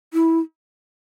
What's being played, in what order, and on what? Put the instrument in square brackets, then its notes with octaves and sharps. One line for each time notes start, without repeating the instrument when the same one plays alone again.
[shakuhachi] E4